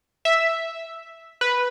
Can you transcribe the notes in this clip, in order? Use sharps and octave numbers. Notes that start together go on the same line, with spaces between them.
E5
B4